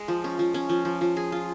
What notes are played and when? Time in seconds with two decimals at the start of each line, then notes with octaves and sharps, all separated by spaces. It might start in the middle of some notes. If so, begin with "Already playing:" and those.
Already playing: G#3
0.08 F3
0.24 C#4
0.39 F3
0.54 C#4
0.69 F3
0.85 F3
1.01 F3
1.17 G#4
1.32 F4